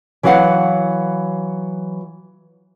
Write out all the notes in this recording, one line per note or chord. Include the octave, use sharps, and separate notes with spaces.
E3 F#3 F#4 C#5 F5 F#5